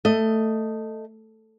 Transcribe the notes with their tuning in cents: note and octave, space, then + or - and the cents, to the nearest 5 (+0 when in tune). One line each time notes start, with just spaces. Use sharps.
A3 +10 D#5 +0